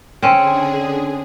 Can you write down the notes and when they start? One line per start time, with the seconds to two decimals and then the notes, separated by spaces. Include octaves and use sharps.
0.22 D3 C4 C#4 G#4